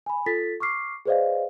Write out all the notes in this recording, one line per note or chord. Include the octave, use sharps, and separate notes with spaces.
G#5 B5
F4 A4 A6 B6
C#6 D6 F6 C7
G#4 B4 C5 D5 D#5 F5